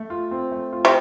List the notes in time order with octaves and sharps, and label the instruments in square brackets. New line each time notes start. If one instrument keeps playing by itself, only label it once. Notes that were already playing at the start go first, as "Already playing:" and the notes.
Already playing: [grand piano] A3
F4
C4
A3
F4
[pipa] C3